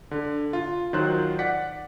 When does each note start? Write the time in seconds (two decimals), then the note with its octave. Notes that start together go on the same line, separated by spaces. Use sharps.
0.11 D3
0.53 F4
0.93 D#3 F#3 F4 C5 F#6
1.39 D5 F#5 B6